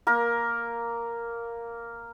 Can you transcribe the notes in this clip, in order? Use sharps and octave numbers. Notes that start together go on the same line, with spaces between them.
A#3 A#4